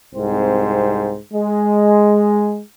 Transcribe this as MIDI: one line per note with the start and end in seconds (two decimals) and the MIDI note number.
0.15 1.16 36
0.15 1.16 44
0.15 1.16 60
0.15 1.16 72
1.33 2.59 56